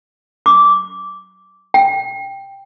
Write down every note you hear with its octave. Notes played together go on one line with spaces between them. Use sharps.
D6
G5